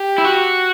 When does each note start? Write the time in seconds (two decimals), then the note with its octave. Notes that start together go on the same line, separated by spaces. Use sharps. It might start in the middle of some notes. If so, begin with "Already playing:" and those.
Already playing: G4
0.18 E4
0.25 F#4